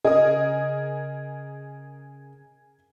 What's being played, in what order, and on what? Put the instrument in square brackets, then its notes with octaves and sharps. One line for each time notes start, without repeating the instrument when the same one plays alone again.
[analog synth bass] C#3 [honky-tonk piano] G#4 A#4 D#6 [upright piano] D#5